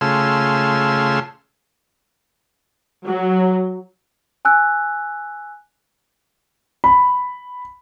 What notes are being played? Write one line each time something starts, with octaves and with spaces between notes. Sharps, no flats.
C#3 A3 F4 G#4 C6 E6
F#3
G#5 E6 F#6
B5